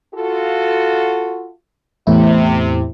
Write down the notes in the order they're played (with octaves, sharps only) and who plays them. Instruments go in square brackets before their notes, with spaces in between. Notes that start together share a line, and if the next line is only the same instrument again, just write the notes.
[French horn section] F4 F#4 A4
[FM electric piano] E2 A2 E4 [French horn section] C3